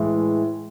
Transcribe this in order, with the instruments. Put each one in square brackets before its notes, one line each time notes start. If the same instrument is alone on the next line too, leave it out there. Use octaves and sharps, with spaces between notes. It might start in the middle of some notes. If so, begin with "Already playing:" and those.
Already playing: [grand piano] A2 E3 G#3